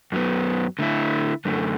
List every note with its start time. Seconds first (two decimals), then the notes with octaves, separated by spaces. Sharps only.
0.12 F#2 F#3 B3
0.79 D3 A3 E4
1.45 F#2 D3 A3